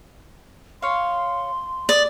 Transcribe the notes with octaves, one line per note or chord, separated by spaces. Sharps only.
C#5 F5 C6
D5 D#6